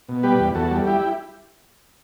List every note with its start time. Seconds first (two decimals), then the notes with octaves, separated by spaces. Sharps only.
0.09 B2
0.23 G3 G4 B4
0.40 E2
0.55 E2 F#4 A4
0.71 G3
0.86 E4 G4